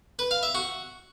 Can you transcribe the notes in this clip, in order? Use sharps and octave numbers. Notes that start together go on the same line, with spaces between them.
B4
F5
E5
F#4